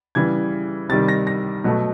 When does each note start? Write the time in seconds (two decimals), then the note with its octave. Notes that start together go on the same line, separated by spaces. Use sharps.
0.15 C#3 E3 G3 G#6
0.89 C3 D#3 G3 A6
1.08 A#6
1.27 A#6
1.64 B2 F#3 A3